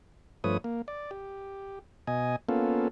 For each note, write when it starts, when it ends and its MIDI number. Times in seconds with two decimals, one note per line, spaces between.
0.44 0.57 43
0.44 0.57 53
0.44 0.57 57
0.44 0.57 71
0.44 0.57 73
0.44 0.57 87
0.64 0.82 58
0.88 1.11 74
1.11 1.79 67
2.07 2.36 47
2.07 2.36 75
2.07 2.36 80
2.49 2.88 58
2.49 2.88 59
2.49 2.88 61
2.49 2.88 65
2.49 2.88 69